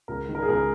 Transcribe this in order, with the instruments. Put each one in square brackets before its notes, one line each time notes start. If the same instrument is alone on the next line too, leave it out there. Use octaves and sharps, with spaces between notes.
[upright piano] C#2 [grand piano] A#4
[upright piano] D#3
[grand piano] A#4
G#4
[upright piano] C#2 [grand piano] A#4